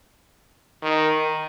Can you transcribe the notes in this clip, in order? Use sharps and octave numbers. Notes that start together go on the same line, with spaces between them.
D#3